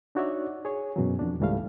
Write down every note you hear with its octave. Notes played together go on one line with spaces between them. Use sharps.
D4 D#4 F#4 C#5 D5 E5
G#4 C#5
F#2 B2 E3 F#3
F2 D4
C#2 G#2 E3 G3 A3 F5